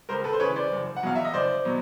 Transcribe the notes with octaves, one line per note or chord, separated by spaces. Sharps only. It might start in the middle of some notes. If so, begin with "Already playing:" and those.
C#2 A#4 C5
A4 B4
C5
C#3 E3 B4 C#5
C5 D5
F#1
F#5
E2 B2 F#3 F5
E5
D#5
F#1 C5 D5
B2 F#3